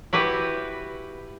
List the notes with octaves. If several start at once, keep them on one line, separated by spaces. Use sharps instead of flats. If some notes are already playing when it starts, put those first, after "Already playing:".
E4 F#4 G4 B4